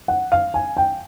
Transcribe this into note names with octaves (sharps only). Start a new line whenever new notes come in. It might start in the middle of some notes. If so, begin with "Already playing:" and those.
F#5
F5
G#5
G5